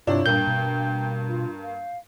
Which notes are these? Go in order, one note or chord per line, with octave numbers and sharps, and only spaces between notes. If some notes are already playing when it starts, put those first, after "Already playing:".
G2 C3 D4 E4 F4 C#5
G2 A#2 A#3 G5 G6
B2
F4
F5